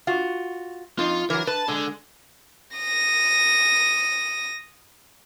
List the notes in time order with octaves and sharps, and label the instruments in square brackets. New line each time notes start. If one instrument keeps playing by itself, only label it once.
[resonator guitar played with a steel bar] F4 F#4
[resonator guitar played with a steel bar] F2 D#4 [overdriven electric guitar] F4
[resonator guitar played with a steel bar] E3 F#3 [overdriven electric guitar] A#4
[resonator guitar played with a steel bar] B4 [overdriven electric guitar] A5
[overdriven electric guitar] D3 [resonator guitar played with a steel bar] G#3
[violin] D#6 A#6